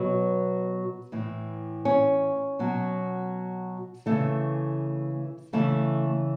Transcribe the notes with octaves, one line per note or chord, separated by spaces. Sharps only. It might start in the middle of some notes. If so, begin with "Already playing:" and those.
Already playing: B2 F#3 B4
A2 E3
C#4
B2 F#3
C#3 E3 A3
C#3 E3 A3